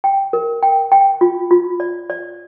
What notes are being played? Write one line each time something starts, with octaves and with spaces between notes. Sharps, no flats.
G5
A#4
G5
G5
F4
F4
D5
D5